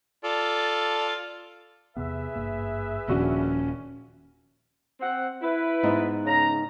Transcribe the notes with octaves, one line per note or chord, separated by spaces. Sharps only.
F4 A4 D5
E2 C3 B3 G#4 B4 E5
G#1 G2 A#3
D#1 F3 C#4 D4 F#4
C4 F#5
E4 B4
G#2 B3 D#4
C#3 A#5